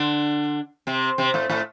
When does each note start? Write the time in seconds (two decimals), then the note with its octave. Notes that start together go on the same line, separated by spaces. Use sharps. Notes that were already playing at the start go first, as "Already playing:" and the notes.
Already playing: D3 D4
0.87 C3 C4
1.18 C3 C4
1.34 A2 A3
1.50 A2 A3